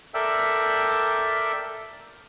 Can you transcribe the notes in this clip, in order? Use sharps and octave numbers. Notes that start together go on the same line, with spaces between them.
A4 A#4 D5 E5 G5 E6